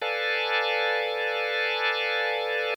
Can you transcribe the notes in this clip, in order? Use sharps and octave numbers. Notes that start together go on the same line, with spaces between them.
A4 B4 D5 F5 G#5 A5